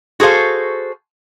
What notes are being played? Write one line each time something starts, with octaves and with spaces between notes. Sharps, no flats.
F#4 G#4 A4 C5 F5